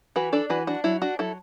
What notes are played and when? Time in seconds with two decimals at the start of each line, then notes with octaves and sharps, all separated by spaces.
0.16 E3 F#4 B4
0.33 D4 A4 D5
0.50 E3 F#4 B4
0.67 D4 F#4
0.84 F#3 E4
1.02 D4 F#4
1.19 F#3 E4 A4